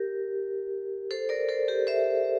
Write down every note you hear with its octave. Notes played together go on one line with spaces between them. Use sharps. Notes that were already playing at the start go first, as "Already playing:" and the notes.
Already playing: G4 A#4
A4 C5
A#4 D5
A4 C5
G4 A#4
C5 E5